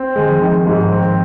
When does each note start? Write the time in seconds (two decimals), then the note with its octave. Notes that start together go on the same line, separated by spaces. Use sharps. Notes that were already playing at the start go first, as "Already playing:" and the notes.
Already playing: C4
0.16 D#3 G#3
0.29 F3
0.42 D#3
0.67 G#2
0.92 C4